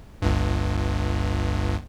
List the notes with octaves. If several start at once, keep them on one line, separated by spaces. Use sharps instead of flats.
G1 C#2 G2